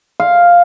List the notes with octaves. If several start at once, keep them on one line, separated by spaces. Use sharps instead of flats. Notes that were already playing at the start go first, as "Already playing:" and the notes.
F5